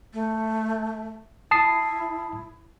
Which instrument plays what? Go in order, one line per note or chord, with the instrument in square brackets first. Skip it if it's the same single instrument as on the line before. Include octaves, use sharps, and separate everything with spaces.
[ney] A3
[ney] E4 [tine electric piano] A5 D#6 C7